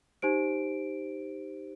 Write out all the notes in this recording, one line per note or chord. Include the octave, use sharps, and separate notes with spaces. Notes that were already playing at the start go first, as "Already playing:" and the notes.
D#4 G4 C5 D7